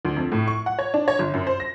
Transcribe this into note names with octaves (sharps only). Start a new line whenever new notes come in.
D2
F2
A2
C#6
F#5
C#5
D4
C#5
G1
F#2
C5
A#6